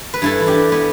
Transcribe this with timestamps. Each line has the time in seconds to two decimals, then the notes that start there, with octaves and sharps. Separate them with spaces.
0.14 B4
0.22 G2 E4 A4
0.40 E3
0.47 D4 G4
0.55 G2
0.72 B3 E4